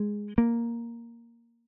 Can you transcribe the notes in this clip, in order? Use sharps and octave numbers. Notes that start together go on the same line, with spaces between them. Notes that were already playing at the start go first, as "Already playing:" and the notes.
Already playing: G#3
A#3